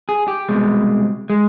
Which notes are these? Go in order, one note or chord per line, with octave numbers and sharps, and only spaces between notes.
G#4
G4
C2 B2 G#3
G#3